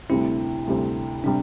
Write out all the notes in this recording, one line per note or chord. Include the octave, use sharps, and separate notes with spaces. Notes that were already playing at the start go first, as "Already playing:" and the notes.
D2 C3 G3 C4 E4
D2 C3 G3 C4
C3 G3 D4